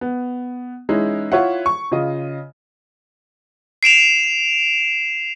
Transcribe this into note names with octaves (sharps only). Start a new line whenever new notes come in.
B3
E3 G#3 C#4 D#4 E4
E4 F4 C#5 E5 F#5
C#6
C#3 F4 D#5
C7 D7 E7 F7